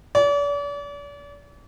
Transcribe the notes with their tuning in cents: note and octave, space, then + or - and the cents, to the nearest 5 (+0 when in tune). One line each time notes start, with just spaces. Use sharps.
D5 -40